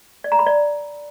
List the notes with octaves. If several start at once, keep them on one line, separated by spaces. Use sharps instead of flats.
D5
A#5
B5
D5